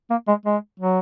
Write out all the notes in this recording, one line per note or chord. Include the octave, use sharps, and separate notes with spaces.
A#3
G#3
G#3
F#3